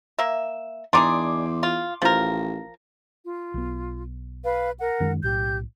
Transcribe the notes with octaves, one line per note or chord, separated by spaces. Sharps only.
A#3 E5
E2 D4 D#4 G#4 C6 D6
F4
A1 F3 A#4
F4
B1 B3
B4 F5
A#4 F#5
F#2 D#3 G#3
B1 A2 G4 G6